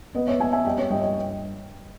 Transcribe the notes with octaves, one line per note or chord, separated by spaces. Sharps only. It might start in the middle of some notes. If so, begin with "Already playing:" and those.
B3 B4 D#5
C#5 E5
B3 E5 G#5
E5 G#5
G3 D#5 G5
C#5 E5
G2 D#5 G5
D#5 G5